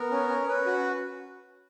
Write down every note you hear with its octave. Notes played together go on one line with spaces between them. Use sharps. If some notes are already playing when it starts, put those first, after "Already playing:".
Already playing: B3 A#4
C#4
C#4
C#4 B4
F#4